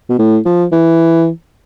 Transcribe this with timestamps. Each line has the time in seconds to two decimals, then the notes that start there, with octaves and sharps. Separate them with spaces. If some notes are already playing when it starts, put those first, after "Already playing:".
0.09 B2
0.19 A2
0.46 F3
0.72 E3